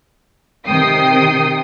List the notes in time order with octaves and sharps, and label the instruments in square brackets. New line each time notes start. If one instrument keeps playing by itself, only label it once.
[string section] C3 D#3 G5 D#6 C7